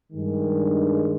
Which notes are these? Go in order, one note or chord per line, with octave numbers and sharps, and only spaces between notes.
G2 D#3 G#3